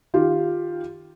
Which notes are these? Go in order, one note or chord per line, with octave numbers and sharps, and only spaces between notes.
D#3 F4 G4